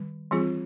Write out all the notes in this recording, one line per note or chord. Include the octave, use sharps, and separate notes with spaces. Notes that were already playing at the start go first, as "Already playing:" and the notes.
Already playing: D#3 G3
E3 G3 C4 F4 G#4